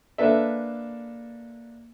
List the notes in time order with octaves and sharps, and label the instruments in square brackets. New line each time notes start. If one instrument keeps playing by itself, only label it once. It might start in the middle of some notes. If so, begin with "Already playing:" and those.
[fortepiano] A#3 D4 A4 B4 E5